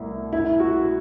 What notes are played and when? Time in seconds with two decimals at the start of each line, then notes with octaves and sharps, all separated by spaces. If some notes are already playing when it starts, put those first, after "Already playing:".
Already playing: C2 B2 A3 E4
0.33 E4
0.60 F#4